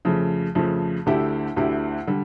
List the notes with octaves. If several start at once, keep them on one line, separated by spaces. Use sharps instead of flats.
F2 C#3 F3 A3
F2 C#3 F3 A3
D2 D3 A3 E4 G4
D2 D3 A3 E4 G4
D3 G3